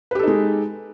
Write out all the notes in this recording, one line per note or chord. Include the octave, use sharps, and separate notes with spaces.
G#3 D#4 G4 A4 B4